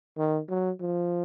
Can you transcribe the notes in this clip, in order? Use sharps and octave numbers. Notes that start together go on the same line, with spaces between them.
D#3
F#3
F3